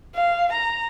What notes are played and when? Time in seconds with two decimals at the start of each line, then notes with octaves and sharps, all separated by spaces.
0.15 F5
0.52 A#5